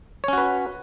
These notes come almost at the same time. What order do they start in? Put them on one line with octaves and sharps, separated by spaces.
C#5 C#4 F#4 B4